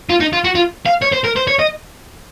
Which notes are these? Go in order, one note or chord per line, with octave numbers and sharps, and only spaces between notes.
F4
D#4
F4
F#4
F4
F5
C#5
C5
A#4
C5
C#5
D#5